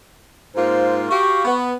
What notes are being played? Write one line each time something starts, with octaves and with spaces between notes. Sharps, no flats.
G#2 A#3 F4 C5
F#4 G4 F5 C#6
B3